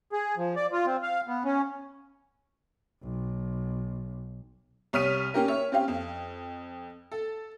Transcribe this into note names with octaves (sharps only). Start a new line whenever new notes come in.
G#4
F3
D5
F4
C4
F5
B3
C#4
B1
C2 C#5 D#6 F6 B6 D#7
A#3 C#4 G4 A#4
C#5 E5
C4 C#4 G4 F5
F2
A4